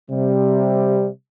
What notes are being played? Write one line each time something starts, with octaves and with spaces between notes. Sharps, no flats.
C3 G3